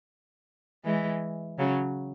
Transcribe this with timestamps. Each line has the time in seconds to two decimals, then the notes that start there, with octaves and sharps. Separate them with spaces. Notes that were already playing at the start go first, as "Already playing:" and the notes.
0.85 E3 G#3
1.59 C#3 F#3